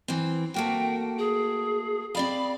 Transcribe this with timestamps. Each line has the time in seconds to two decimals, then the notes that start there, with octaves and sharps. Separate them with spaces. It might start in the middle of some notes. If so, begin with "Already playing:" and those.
0.08 E3 C4
0.54 A3 A#3 F#4 G5
1.18 G#4
2.15 C4 D5 F5 B5